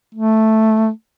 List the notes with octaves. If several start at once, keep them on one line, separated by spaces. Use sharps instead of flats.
A3